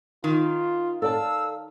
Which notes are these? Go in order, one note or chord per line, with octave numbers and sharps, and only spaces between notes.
D#3 F4
A4 D5 F5 A5 E6